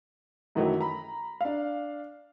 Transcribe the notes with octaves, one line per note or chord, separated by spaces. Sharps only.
F#2 D#3 E3 F#3 A3
A#5 B5
D4 F5